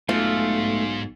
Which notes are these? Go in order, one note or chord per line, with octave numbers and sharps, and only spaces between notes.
B1 G#2 A3 F4